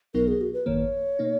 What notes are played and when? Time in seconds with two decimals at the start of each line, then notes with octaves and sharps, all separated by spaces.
0.14 B1 B2 F#3 B3 D#4 A#4
0.28 G#4
0.41 F#4
0.53 B4
0.66 G#1 F#2 D#3 A#3 C#5
1.19 B2 A#3 D#4